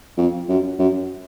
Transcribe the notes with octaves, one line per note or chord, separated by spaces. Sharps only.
F2
F#2
F#2